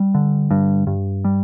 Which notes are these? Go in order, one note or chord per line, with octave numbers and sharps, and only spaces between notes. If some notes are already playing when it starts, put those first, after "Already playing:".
Already playing: G3
D3
G2
G2
G3